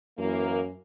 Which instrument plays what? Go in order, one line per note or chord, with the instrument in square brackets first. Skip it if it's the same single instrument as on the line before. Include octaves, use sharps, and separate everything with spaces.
[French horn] F#2 [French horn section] E3 A#3